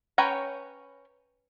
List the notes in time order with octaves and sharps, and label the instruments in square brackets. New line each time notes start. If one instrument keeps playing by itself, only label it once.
[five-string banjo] C#4 B4 C#5 G5 A#5